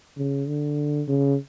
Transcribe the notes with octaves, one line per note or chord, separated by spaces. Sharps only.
C#3
D3
C#3